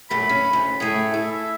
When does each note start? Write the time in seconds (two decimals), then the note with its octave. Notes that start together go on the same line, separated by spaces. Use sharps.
0.10 F#2 A#2 A3 B5
0.29 C#4
0.53 D2
0.80 A2 A3 G#4
1.14 E4 A4
1.30 E5